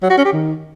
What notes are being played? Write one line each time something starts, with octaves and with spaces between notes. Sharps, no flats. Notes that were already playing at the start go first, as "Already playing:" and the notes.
F#3
F#4
C#4
G4
D#3